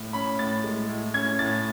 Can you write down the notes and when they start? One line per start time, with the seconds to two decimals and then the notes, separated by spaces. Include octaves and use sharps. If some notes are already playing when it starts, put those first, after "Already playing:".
Already playing: A2
0.13 C#4 B5
0.39 A2 A6
0.64 G#3
0.89 A2
1.14 C#4 G#6
1.39 A2 A6